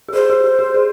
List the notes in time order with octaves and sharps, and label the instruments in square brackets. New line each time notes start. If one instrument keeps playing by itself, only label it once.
[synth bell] G4
[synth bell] G#4 [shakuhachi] C5
[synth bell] G4
G4
G4
G#4